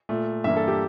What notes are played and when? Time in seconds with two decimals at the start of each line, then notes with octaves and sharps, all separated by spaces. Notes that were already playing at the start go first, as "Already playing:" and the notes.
0.09 A#2 A3
0.44 G2 E3 A#3 E5
0.56 A4
0.68 G4